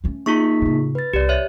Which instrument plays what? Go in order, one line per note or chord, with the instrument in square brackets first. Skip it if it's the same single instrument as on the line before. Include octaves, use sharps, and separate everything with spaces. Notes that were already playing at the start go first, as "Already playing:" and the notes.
[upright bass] A3 C#4
[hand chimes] A#3 D#4 B6 [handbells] F4 G#4 C#6
[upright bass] A2 C#3
[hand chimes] B4 A6
[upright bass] C2 [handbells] G4 D5
[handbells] C#5 E5